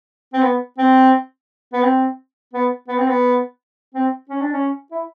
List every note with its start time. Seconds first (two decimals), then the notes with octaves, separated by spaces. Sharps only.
0.34 C4
0.42 B3
0.78 C4
1.73 B3
1.83 C4
2.53 B3
2.88 B3
2.98 C4
3.08 B3
3.95 C4
4.30 C#4
4.41 D4
4.52 C#4
4.91 E4